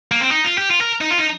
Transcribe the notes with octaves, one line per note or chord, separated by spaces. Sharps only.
A#3
C4
D#4
F4
G4
F4
A#4
D#4
F4
D#4